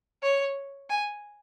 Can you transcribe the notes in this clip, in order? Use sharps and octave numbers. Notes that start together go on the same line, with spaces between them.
C#5
G#5